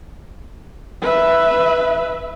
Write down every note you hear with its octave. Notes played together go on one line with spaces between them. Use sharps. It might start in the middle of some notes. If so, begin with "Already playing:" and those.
B4 E5